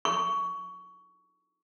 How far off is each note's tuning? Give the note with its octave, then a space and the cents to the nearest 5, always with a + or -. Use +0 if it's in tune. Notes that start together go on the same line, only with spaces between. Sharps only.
C#6 +20